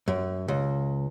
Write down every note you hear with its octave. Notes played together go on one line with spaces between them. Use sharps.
F#2
C#2